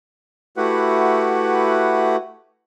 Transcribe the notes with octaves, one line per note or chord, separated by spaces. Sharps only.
A3 E4 F#4 G4 B4 F#5